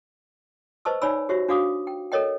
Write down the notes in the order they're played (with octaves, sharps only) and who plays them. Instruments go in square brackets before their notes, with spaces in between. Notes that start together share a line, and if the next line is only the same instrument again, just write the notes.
[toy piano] B4 C5 D#5 A5 C#6 E6
D#4 C#5 D5 G#5 B5 E6
F#4 G4 C5 C#5 E5
D4 F#4 F5 D6 D#6
G5
A4 A#4 C#5 D#5 G5